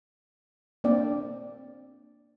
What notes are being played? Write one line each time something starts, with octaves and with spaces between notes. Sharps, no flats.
A#3 C4 D4 D5 G5